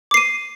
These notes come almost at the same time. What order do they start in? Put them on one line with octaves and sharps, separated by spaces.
D6 C7 D#7